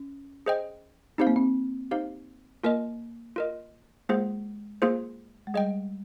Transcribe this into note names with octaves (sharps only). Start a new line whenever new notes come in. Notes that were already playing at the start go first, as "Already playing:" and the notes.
Already playing: C#4
G#4 C5 D#5 G5
C4 D#4 G4 C5 F5
A#3
C4
D#4 G4 C5 F5
A#3 F4 A#4 D#5
F4 A#4 D#5
G#3 A#3 F4 G#4 C5
A#3 F4 G#4 C5
G#3
G3 G#4 D#5 G5